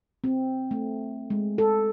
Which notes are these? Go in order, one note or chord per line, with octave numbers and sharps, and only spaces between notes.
C4
A3
G#3
A4